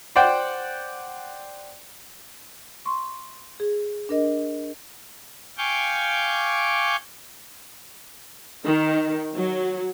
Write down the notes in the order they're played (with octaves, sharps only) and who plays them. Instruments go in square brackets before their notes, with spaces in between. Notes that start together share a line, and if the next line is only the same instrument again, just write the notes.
[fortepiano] C5 D5 F#5 G5
[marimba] C6 C#6
G#4
D4 A#4 D#5
[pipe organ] F5 G5 G#5 C#6 D6 G6
[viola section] D#3
F#3